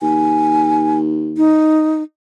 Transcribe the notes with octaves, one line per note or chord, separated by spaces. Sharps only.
D#2 G#5
D#4